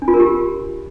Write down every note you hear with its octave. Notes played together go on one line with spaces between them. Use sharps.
D4
F4
A#4
G4